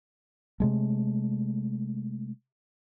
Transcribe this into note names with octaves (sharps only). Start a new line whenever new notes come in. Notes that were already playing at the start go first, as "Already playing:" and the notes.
C3 G#3 A3